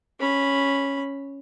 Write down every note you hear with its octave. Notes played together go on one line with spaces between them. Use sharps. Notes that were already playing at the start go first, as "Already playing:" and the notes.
C#4 B5